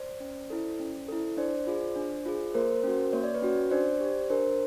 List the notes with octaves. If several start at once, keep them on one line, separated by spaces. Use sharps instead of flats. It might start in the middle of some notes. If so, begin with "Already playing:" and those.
Already playing: C5 D5
C#4
E4 A4
C#4
E4 A4
D4 C5 D5
F4 G#4
D4
F4 G#4
A#3 A#4 C5
C#4 F#4
A#3 C#5
D5
B4 C#5
C#4 F#4
D4 C5 D5
G4
D4 A#4 C5